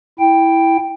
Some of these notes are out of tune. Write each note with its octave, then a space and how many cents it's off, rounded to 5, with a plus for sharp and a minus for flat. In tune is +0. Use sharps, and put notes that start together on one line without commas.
E4 +0 G5 +0